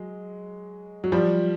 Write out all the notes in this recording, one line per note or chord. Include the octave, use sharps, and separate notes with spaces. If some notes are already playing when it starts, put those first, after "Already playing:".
Already playing: F#3 G#3
F#3
F3 G3